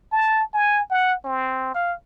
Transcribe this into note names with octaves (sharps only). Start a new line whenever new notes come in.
A5
G#5
F#5
C4
F5